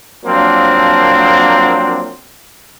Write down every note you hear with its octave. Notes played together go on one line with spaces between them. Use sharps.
F3 F#3 A#3 C4 D4